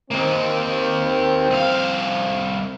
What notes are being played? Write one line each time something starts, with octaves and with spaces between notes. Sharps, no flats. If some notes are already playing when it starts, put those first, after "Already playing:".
D#3 A#3 C4
C2 F5